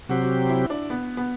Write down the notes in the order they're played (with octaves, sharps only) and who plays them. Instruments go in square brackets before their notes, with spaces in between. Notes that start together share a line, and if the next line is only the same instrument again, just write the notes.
[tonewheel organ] C3 F#3 C4 G4 [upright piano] F#4
[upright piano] F#4
E4
D4
B3
B3